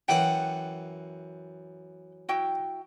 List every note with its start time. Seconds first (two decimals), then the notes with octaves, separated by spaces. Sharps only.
0.08 F#2 E3 F#5 G5
2.29 E4 F#4 G5